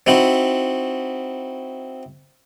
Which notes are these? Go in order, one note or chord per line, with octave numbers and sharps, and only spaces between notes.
C4 D#4 E4 F#4 C5